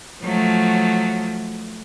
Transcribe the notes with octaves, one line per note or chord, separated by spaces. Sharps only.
F3 F#3 A3